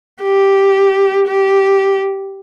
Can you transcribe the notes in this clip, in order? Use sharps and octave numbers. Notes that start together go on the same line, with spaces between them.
G4
G4